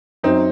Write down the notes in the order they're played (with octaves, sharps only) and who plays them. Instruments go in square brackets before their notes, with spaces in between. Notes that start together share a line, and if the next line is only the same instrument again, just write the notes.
[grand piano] F#2 F#3 C4 D#4